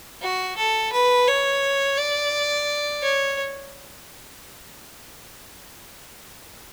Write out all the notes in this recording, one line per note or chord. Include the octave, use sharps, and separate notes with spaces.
F#4
A4
B4
C#5
D5
C#5